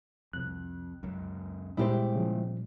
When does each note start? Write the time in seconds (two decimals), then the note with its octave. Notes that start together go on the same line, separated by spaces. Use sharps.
0.33 C2 F2 F#6
1.03 C#2 F#2
1.77 A#2 G3 G#3 B3 E4 G4 C5
2.15 C#3 F3